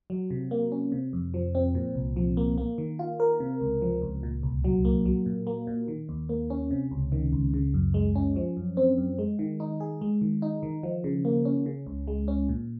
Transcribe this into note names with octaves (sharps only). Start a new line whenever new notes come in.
F#3
C3
A#3
C#4
C3
F2
F3
C4
A#2
C2
F3
A#3
A#3
D#3
F4
A#4
C3
C#2
F3
C#2
A#2
C2
F#3
A#3
F#3
A#2
A#3
A#2
D#3
D#2
A#3
C#4
C3
C#2
D#3
C#2
C#3
F#2
G#3
C#4
F3
F#2
C4
F#2
G#3
D#3
D#4
G#4
G#3
D#3
D#4
D#3
F3
C#3
A#3
C#4
C#3
C#2
G#3
C#4
A#2